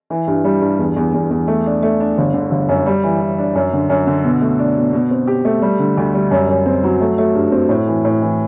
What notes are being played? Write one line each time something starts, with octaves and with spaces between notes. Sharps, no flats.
E3
G2
G3
G2
E2
E2
E2
E2
A3
D4
A3
D4
G1
D3
G1
F#2
G3
E3
E3
D4
F#2
D3
F#2
D3
B2
A3
D4
B2
B2
C4
G4
A3
G3
D3
D2
G3
F#2
F#2
C4
F#3
A3
A3
G2
C4
A2
E3
A2
E3